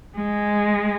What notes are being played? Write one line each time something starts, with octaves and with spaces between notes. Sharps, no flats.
G#3